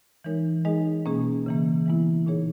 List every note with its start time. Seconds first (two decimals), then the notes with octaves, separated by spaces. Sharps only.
0.24 E3 G#3 D#4 A#4 C#5
0.65 G#3 D#4 G#4 D#5
1.06 B2 A#3 C#4 G#4
1.46 C#3 E3 A#3
1.86 E3 G#3 B3 E4
2.26 A#2 G#3 D#4 G#4 C#5